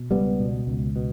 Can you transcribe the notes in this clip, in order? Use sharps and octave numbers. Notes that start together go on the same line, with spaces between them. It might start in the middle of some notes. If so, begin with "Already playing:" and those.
Already playing: B2
C#2 G3 B3
B2
C#2
B2